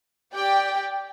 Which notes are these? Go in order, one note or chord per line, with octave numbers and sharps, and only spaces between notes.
G4 D5 G5